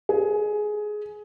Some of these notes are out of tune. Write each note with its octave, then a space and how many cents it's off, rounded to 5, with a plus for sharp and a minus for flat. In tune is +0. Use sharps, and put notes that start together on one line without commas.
G#4 +15